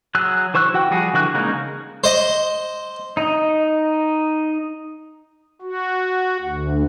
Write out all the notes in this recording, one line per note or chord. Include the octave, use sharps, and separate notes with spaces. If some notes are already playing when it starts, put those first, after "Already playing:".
F#3 G#4 E6 F#6
E3 C5 C#6 E6 F#6
E3 F#4 F#5 G5
F3 G3 F#4 G#4
D3 E3 F#4 F6 F#6
C#3 G#3 A#3 C#4 D#4
C5 D#5
D#4 D#5
F#4
D2